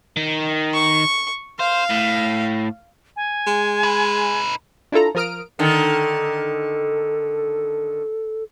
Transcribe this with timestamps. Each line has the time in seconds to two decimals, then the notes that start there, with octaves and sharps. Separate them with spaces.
0.17 D#3
0.74 C#6
1.60 C5 F5
1.90 A2
3.16 G#5
3.47 G#3
3.83 D#4 B4
4.92 D4 E4 F4 A4 A#5
5.15 F3 F4 A#4 D#6 F6 D7
5.59 D3 D#3 A4